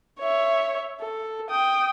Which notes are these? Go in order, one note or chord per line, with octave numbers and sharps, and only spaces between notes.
C#5 E5
A4
G5 D#6